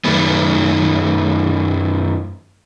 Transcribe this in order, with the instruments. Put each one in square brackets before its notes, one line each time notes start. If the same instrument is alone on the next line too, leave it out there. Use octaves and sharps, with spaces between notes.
[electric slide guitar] F#2 D#3 A3 B3